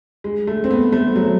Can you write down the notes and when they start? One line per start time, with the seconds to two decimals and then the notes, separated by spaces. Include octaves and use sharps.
0.24 G#3
0.47 A3
0.64 C4
0.71 B3
0.93 A3
1.16 F#3